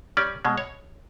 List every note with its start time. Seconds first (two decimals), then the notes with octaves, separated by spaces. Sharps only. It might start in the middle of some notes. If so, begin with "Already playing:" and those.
0.17 G3 C#4 D5
0.45 B2 G#3
0.58 C#5